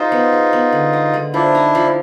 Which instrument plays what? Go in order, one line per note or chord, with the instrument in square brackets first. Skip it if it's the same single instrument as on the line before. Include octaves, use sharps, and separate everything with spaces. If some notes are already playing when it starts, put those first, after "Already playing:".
Already playing: [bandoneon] D#4 F4 [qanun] G#4 C5
[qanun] B3
G#4
B3
D3
G#3
D3
[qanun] F3 [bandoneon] D4 E4
[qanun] D#4
F3